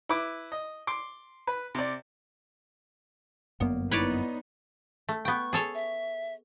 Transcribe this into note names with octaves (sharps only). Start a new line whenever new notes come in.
E4 B4 D6
D#5
C6 D6
B4
C3 D5
G1 F#2 A#3 B3
B3 D#4 E4 B4 C#5 D5
A3
B3 G5 C#6
G#4 A4 C#5
E5